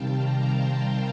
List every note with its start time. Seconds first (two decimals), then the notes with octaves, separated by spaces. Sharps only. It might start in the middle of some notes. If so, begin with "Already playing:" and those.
Already playing: C3 D#3 G3 F5 G5 A5
0.24 A#5
0.56 C6